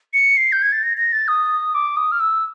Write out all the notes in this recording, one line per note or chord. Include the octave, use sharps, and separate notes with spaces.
C#7
C7
G6
G#6
A6
A#6
A#6
A6
D#6
D6
D#6
F6
E6